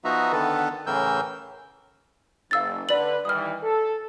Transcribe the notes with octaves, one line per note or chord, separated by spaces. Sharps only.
F3 B3 D#4 F#4 E5 A#5
D3 D#3 B3 A4 B4
A2 C#3 E3 A#4 E6 G6
F#1 F5 E6 A6
D3 B4 D5 F#7
D#3 E3 G3 D#6 F6
A4